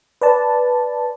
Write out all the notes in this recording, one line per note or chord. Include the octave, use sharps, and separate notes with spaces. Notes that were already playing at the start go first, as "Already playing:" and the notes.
B4 D5 A5